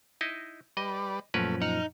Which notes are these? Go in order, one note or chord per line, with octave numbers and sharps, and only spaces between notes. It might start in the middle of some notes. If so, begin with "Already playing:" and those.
D#4 E4 D#5
G3 B4 D5 D#5
F#2 A#2 F3 A3 C#4 A#4 B4
D#4 F#5 F6